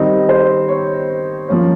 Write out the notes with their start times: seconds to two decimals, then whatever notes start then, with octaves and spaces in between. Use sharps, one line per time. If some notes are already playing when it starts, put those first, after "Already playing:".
Already playing: D#3 G3 C4 D#4 D#5
0.29 C5
0.68 C#5
1.48 F3 A#3 C#4